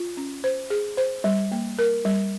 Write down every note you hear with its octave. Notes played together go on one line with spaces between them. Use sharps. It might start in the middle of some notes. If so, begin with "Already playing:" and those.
Already playing: F4
C#4
C5
G#4
C5
G3
A#3
A#4
G3